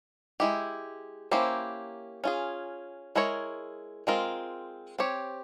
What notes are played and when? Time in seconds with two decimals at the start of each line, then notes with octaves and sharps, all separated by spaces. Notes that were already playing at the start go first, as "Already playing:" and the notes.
0.40 G#3 E4 G4
1.31 A#3 C#4 E4 G4 C5
2.24 C#4 F4 G#4
3.15 G#3 E4 A#4 C#5
4.07 G#3 C4 F4 A#4
4.99 C4 G4 C#5